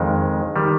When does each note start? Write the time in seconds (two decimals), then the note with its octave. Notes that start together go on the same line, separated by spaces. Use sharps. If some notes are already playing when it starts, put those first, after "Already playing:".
Already playing: F2 D#3 G#3
0.56 D#3 G3